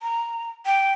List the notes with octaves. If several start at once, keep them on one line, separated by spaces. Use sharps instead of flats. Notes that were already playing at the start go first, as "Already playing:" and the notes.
A#5
G5